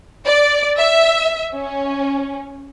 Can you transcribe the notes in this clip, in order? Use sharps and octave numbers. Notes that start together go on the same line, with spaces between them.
D5
E5
C#4